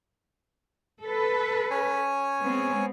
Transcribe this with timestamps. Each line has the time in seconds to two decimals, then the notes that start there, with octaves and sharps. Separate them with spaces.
1.03 A4 B4
1.71 C#4 C#5 G#5
2.40 G#3 B3 C4